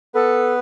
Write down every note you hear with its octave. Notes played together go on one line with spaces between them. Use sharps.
B3 A4 B4